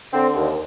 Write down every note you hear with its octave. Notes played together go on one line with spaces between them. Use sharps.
D3 C4
D#2